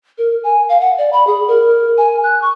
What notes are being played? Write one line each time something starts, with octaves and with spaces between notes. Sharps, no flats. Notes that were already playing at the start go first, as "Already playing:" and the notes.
A#4
G#5
F5
F#5
D5
B5
G#4
A#4
G#5
F#6
C#6